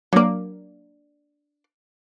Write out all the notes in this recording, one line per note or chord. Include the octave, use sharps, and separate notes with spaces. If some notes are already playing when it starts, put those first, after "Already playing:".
F#3 A#3 D4 D5